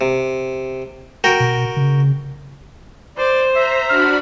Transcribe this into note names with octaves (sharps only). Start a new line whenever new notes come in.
C3
F#4 A#4 G5
B2
C#3
C5 D5
E5 A#5
D4 F#4 B5 F6